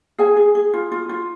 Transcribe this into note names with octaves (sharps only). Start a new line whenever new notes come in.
G#4 G#5
G#4
G#4
F4
F4
F4